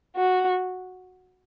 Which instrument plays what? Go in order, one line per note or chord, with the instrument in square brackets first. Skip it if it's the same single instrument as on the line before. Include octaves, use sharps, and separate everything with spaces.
[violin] F#4